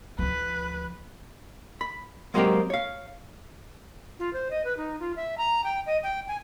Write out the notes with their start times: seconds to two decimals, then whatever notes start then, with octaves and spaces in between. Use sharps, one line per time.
0.19 D2 F3 B4
1.81 B5
2.34 F#3 G#3 A#3 C4 G4 A#4
2.70 C#5 F5
4.19 F4
4.33 C5
4.51 D#5
4.64 B4
4.77 D#4
5.00 F4
5.16 E5
5.38 A#5
5.64 G5
5.86 D#5
6.03 G5
6.28 G#5